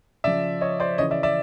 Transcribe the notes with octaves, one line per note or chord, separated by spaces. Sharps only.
C#3 F3 D5 E5
C#5 D#5
C5 D5
C#3 E3 C#5 D#5
D5 E5
D5 E5